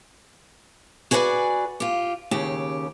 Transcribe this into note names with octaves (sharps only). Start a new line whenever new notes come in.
F#4 G#4 B4 C#5 D5 G#5
F4 G4
D#2 C#3 G4